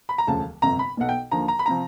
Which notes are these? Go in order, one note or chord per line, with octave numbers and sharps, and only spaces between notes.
B5
A#5
E1 D2 C#3 F3 A5
G1 F2 C3 A#5
B5
B1 B2 F#5
G5
D#2 D3 F3 A#5
A#5
B5
C3 F3 A#5